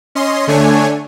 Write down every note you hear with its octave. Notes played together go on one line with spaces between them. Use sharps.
C#4 D#5 C6
D3 A3 D4 C#5 G#5